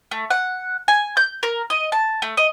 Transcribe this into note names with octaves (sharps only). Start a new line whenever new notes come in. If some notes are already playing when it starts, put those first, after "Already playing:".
A3
F#5
G#5
G6
A#4
D#5
A5
A3
D#5